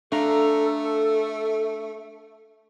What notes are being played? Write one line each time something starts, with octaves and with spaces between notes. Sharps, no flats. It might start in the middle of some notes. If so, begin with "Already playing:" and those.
A3 D4 A4 F5 A#5